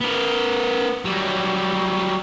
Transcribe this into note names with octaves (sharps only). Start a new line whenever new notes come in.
B3 A#4
F#3 G3